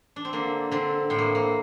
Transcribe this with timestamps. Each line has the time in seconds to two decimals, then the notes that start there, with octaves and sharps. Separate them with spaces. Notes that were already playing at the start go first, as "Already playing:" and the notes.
0.16 D4
0.25 C4
0.33 D3 A#3
0.71 D3 C4
1.10 A2 C4
1.19 A#3
1.35 A#3